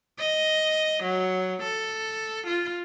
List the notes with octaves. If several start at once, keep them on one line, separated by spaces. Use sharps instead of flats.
D#5
F#3
A4
F4